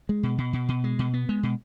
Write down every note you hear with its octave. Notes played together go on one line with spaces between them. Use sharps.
G#3
B2
B2
B2
B2
G#3
B2
B3
G#3
B2